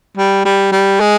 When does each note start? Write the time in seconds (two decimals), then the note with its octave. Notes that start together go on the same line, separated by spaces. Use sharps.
0.17 G3
0.45 G3
0.72 G3
1.00 G#3